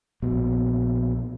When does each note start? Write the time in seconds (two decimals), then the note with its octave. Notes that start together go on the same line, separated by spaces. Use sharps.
0.22 A#1 B2